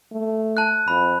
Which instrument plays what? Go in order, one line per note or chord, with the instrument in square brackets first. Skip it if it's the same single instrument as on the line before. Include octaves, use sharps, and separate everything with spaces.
[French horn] A3
[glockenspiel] A5 F#6
[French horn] F2 [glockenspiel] B5